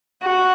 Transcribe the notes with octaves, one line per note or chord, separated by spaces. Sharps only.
F#4